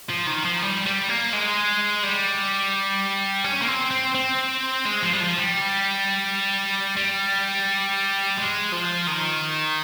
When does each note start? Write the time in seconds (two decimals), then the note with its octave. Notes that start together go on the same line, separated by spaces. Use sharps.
0.09 F3
0.27 D#3
0.45 F3
0.62 G3
0.86 G3
1.09 A#3
1.33 G#3
2.03 G3
3.44 C#4
3.62 A#3
3.67 C4
3.91 C4
4.15 C4
4.85 G#3
5.02 F3
5.13 G3
5.21 F3
5.38 G3
6.97 G3
8.37 G#3
8.73 F3
9.08 D#3